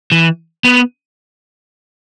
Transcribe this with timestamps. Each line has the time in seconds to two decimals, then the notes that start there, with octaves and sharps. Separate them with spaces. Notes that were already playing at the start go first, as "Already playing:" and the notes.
0.12 E3
0.65 B3